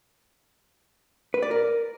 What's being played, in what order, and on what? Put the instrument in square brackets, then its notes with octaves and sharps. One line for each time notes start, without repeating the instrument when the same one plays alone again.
[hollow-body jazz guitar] B4
D5
A#4